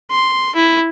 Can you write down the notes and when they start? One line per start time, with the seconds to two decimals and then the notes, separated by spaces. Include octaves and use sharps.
0.11 C6
0.55 E4